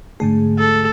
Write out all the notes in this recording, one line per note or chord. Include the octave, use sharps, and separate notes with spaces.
G#2 D3 A3 G#4
A4